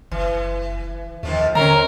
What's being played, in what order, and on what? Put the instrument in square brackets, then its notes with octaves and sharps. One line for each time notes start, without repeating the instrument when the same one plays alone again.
[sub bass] F#1 [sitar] E3
[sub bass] D#2 [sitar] D#3 F3 A3
[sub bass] D3 [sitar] C4 C#4 C#5 [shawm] A#4 [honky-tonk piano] A#5